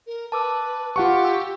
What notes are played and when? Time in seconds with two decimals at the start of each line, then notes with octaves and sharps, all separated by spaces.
0.07 A#4
0.32 B4 A5 D6 E6
0.96 F4 G4 F#5 C#6
1.23 G5 E6